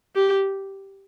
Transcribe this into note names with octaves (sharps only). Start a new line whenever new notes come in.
G4